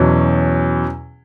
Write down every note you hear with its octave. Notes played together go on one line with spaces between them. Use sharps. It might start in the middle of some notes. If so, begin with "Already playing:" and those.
Already playing: E2 B2 F#3 C#4